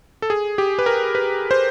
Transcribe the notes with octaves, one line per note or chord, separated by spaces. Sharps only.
A4
G#4
G4
B4
A#4
B4
C5